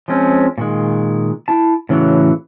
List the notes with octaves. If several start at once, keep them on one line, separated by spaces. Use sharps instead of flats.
F3 G#3 C4 C#4
A#2 D#3 G#3
E4 A5
A2 C#3 E3 F#3